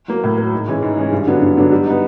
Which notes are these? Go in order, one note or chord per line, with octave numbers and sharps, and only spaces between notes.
F#3 A#3
A2
F#3 A#3
G#2
E3 G#3 C#4
G#2
E3 G#3 C#4
G2
D3 F#3 B3 D4
G2
D3 F#3 B3 D4
G3
B3 D#4